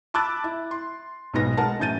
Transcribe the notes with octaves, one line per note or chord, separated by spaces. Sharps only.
A5 B5 D6 E6 F#6 A6
E4
C6
B1 G#2 B2 B3 A#6
G#3 A#4 F#5 A5
F#2 A2 E3 G6 A6 D#7